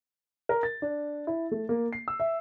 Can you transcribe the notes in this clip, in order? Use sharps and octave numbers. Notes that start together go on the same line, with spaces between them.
A#4
A6
D4
E4
A3
A#3
C7
E6
E5